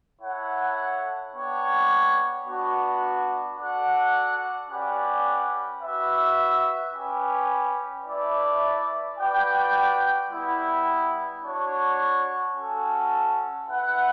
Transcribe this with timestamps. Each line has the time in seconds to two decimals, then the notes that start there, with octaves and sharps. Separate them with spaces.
0.21 E4 A4 C#5 F#5
1.33 B3 D4 G4 C#5 F#5
2.46 B3 D4 F#4
3.57 F#4 A4 D5 F#5
4.70 C#4 G4 B4 D5 F#5
5.82 F#4 B4 E5
6.93 C#4 G4 B4
8.06 A3 E4 B4 D5
9.19 F#4 B4 D5 G5
10.30 G3 B3 E4
11.43 D4 F#4 C#5
12.54 C#4 F#4 A4
13.67 E4 B4 F#5